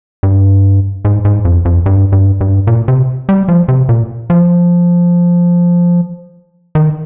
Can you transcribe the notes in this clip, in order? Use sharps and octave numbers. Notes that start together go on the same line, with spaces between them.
G2
G#2
G#2
F2
F2
G2
G2
G2
A#2
C3
G3
F3
C3
A#2
F3
D#3